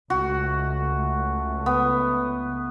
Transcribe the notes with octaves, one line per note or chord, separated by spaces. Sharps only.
C#2 A3 F#4
B3